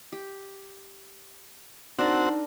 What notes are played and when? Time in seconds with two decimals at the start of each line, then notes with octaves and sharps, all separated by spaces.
0.12 G4
1.99 C4 D4 D#4 F#4 A#4 A5